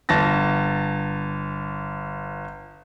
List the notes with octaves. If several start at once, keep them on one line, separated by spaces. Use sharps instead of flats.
G1 A5 A6 A#6